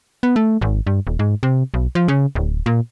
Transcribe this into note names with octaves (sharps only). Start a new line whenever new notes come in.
B3
A3
G#1
G2
D#1
G#2
C3
B1
F3
C#3
D1
A#2